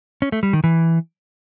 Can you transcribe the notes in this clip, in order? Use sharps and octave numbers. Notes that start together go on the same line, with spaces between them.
C#4
A3
G3
D#3
E3